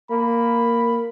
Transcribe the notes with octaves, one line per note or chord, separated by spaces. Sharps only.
A#3 B5